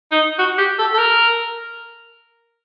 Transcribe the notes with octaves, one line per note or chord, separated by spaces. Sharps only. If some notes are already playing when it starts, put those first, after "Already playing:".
D#4
F#4
G4
A4
A4
A#4